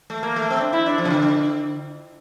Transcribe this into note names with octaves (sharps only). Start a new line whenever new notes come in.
A3
A#3
A3
C4
D4
E4
D4
F3
C3
D3